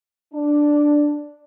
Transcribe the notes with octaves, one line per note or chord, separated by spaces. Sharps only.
D4